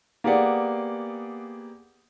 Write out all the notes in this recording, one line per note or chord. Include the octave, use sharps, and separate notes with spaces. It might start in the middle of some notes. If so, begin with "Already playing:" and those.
A#3 B3 G4 G#4 D5 F#5